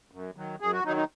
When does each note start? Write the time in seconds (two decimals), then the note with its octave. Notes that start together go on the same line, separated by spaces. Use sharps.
0.11 F#2
0.36 D#3 F#3
0.60 F#2 G#4
0.73 F#4
0.84 F#3 D#4
0.88 D#3
0.97 D#4